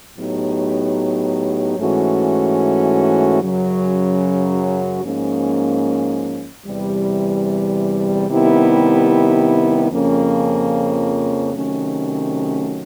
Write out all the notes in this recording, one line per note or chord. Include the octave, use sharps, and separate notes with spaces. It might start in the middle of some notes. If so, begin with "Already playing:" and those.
A2 F#3 B3 D#4 G4
G#2 E3 A3 C#4 F#4
F#2 C#3 F#3
G#2 F3 A#3 C#4
E2 C3 E3 G3
C3 D#3 G3 B3 E4
F2 C#3 F3 A#3 C#4
C3 D#3 F#3 A3 C#4